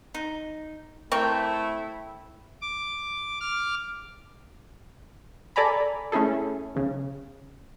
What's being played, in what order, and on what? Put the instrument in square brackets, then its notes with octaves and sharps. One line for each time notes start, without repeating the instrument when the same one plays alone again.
[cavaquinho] D#4
[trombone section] A3 [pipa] C4 A#4 C#6 [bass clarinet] E4 [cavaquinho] G5
[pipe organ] D6
D6 F6
[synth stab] A4 D5 G#5 A#5 B5
A3 C#4 E4 G#4 A4
B1 C#3